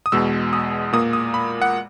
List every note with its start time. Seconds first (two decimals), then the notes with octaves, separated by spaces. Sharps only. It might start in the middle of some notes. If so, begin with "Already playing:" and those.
0.06 D#6
0.12 E2 B2 G#3 E6
0.53 D#6
0.93 A#2 A#3 D#6
1.13 D#6
1.34 B5
1.62 F#5